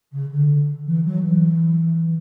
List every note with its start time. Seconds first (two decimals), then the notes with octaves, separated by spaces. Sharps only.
0.12 C#3
0.30 D3
0.86 E3
1.05 F#3
1.22 E3